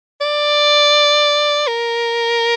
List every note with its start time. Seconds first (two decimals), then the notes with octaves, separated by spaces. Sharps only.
0.21 D5
1.67 A#4